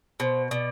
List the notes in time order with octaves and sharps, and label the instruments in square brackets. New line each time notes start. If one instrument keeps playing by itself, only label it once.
[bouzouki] B2 [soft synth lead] C5
[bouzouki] B2 [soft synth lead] D5